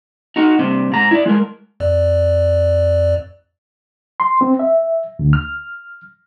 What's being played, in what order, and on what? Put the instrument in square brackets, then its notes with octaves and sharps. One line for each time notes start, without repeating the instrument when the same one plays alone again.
[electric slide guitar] D#4 F#4
G2 C3
G#2 A#5
E4 D5
G#3 A#4
[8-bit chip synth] F2 D5
[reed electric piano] C6
C4
E5
D2
F6